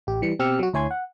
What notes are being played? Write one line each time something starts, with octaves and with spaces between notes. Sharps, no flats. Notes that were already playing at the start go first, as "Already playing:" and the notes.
A1 G4
E3 G3 C#7
B2 C4 G4 E6 F6 C#7
F#3 F#4
D2 E4 C#5 G#5 C6 G#6
F#5